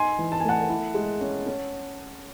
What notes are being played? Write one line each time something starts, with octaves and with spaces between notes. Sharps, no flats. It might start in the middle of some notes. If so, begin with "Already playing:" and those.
Already playing: D#4 G#5 C6
E3
A5
G#5
A3 F#5 A5
E4
G#3
C#4
C#4